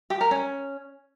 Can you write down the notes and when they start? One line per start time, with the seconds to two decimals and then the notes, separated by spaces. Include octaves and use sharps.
0.10 G4
0.21 A#4
0.31 C#4